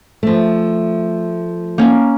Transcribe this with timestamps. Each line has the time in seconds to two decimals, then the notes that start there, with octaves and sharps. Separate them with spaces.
0.23 F3 A3
1.78 A#3 C#4